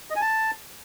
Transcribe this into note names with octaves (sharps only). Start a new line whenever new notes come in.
D#5
G#5
A5